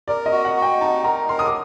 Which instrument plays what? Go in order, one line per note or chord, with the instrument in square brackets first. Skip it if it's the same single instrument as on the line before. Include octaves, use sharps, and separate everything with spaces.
[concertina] A#4 [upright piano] D5
[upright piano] D#5
[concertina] F#4
[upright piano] F#5
[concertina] F#4
[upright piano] G5
[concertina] D#4 [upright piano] A5
[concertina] A#4 [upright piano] A#5
[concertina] A#4 [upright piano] C6
[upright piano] D#6
D6